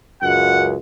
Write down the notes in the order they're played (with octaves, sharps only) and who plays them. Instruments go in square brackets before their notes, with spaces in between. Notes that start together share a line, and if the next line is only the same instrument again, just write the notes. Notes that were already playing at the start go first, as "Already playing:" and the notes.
[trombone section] C#2 F#2 [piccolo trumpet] F#5